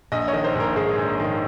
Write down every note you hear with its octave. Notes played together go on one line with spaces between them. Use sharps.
A#1 D#5
C#5
D#3
C5
A#1 A#4
G#2 G#4
A#1
D#3